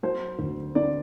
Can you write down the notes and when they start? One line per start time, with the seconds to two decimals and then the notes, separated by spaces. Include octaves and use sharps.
0.03 F#3 C5
0.39 D2
0.75 D3 D5